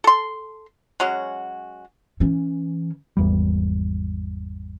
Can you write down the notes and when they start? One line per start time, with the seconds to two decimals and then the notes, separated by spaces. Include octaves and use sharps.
0.04 A4 C6
1.00 F#3 G#3 C#4 F#4
2.20 E3 C#4
3.17 G#1 E2 G3